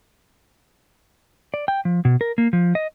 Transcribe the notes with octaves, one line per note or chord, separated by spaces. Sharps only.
D5
G5
F3
B2
A#4
A#3
F3
D#5